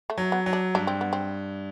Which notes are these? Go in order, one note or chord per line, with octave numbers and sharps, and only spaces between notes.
A3
F#3
B3
F#3
D4
G2 D4
C4
B3
C4